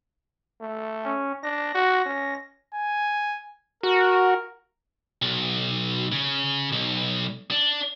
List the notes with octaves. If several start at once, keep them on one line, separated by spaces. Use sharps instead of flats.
A3
C#4
D4 A#6
F#4
C#4
G#5
F#4 A#4
B1
C#3
B1
D4